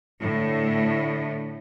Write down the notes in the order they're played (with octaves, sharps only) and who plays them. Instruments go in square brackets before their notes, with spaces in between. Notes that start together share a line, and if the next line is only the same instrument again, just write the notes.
[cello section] A2 [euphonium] D3 [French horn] E4